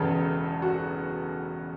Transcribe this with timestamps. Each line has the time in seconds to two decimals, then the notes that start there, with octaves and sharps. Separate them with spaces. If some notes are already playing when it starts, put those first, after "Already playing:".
Already playing: E1 E2 C#3 A4
0.62 F#4